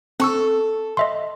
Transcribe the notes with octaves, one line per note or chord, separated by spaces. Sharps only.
C4 A4 C#6 E6
D#5 E5 C6